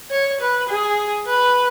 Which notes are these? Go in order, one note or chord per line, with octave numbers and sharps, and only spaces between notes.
C#5
B4
G#4
B4